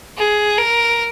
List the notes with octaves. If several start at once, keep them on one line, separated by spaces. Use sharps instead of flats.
G#4
A#4